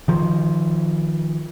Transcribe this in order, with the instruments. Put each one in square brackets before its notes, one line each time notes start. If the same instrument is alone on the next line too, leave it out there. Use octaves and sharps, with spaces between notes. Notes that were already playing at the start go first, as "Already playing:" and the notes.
[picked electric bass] D#3 F3